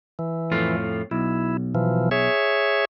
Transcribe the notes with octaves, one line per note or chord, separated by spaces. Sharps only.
E3
F2 A2 F4
B1 E4
B2 E3 F3
G#4 C#5 E5